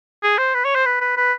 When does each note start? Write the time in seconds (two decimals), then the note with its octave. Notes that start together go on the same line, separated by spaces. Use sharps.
0.23 G#4
0.38 C5
0.54 B4
0.65 C#5
0.75 C5
0.86 B4
1.01 B4
1.17 B4